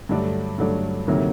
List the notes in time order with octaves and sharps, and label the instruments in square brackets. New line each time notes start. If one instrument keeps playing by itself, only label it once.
[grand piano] G2 D3 F#3 A3 D4
G2 D3 F#3 A3 D4
D2 C3 D#3 F#3 A#3